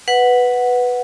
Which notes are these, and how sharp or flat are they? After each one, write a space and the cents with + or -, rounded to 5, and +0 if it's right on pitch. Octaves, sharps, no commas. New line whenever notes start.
B4 +0 F#5 -5